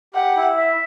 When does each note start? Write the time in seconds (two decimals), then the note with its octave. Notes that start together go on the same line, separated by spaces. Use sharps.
0.14 G4 F#5
0.37 E4
0.57 E5